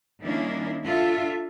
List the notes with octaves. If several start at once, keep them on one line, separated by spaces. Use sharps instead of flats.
D#3 G3 A#3 C#4 D4 E4
D4 F4 A4 E5